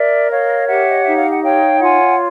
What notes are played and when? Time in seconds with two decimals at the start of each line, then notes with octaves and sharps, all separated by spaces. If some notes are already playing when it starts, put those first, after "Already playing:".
Already playing: A#4 D5 E5
0.30 C#5 D#5 F5
0.67 G4 E5 F#5
0.88 D#5
1.02 D#4 E5
1.15 F5
1.30 F#5
1.43 C#5 F5 G5
1.80 F4 F#5 G#5